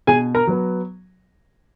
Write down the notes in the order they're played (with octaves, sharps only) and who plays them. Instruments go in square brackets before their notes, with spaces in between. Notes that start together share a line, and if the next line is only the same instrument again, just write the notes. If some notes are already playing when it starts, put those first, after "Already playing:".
[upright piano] B2 G#4 G#5
A#4 A#5
F#3 B3